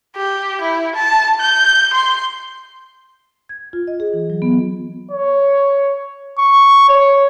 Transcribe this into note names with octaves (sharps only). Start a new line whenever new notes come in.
G4
E4
A5
G6
C6
G#6
F4
D#5
G#4
E3
F#3
B3
C#5
C#6
C#5